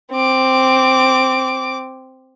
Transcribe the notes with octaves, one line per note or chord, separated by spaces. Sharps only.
C4 D6